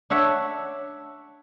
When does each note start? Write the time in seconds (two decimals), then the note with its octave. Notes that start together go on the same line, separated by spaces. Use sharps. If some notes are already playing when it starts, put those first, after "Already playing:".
0.10 D4 C#5 E5 F#5